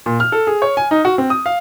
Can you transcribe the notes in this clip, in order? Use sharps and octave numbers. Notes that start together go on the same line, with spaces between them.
A#2
F6
A4
G#4
C#5
G#5
D#4
F#4
C4
D#6
F5